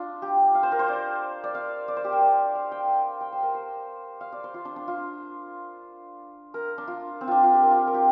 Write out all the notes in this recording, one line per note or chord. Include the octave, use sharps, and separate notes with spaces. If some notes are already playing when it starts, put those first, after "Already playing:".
Already playing: D4 F4
G4
F5
C5
A#4
C5
D5
D5
F5
D5
C5
G4
A#4
D5
F5
G5
F5
G5
C5
A#4
C5
F5
D5
C5
F4
D4
D4
F4
A#4
D4
F4
C4
D4 F4
F4
G4
A#4
F4
A#4
G4